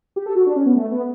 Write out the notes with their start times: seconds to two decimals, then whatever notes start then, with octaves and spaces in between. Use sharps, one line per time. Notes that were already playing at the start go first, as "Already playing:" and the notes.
0.16 G4
0.26 A4
0.35 F#4
0.46 D4
0.56 C#4
0.66 B3
0.76 A3
0.91 B3